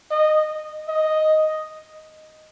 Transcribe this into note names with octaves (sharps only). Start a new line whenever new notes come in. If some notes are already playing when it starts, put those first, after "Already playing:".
D#5
D#5